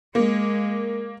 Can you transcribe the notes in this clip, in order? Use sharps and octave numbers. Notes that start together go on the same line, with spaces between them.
G#3 A#3